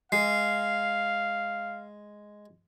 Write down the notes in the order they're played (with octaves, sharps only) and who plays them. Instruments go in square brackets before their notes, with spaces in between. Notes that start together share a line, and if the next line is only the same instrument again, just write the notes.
[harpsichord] G#3 [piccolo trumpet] F5 [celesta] C7